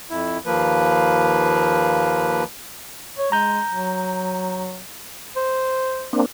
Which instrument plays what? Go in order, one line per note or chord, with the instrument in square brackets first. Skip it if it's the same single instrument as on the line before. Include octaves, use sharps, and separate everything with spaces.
[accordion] F2 E4
D#2 F3 A#3 B4
[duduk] C#5
[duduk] G#3 [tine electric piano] A#5 G6
[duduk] F#3
[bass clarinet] C5
[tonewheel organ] A#3 C4 D4